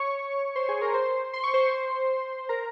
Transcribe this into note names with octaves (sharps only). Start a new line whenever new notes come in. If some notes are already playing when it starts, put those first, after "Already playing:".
Already playing: C#5 C#6
C5 C6
G#4 G#5
A#4 A#5
C5 C6
C6
C#6
C5 C6
A#4 A#5